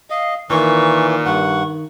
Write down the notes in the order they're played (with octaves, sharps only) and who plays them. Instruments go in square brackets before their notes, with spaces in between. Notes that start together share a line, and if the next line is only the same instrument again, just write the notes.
[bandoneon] D#5 [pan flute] F5
[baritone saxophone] A#2 [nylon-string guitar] D#3 [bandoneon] E3 [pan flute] C#6
[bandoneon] G2 F#5 [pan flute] C#6